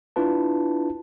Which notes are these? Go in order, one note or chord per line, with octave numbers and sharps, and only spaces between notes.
D4 E4 F4 B4 A5